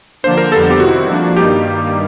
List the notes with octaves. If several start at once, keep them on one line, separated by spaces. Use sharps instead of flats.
D3 F3 A#3 D4 C5
A#4
F2 D3 G3 B3 A4
G4
C3 D#3 G3 C4 E4 F#4
F3 A#3 D4
G2 D#3 G3 A#3 D#4 G4